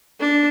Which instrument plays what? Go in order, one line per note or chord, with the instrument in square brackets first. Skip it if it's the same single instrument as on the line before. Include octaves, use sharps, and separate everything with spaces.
[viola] D4